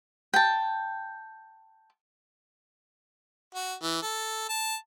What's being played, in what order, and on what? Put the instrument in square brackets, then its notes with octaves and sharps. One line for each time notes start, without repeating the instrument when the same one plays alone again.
[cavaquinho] G5 A5
[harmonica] F#4
E3
A4
A5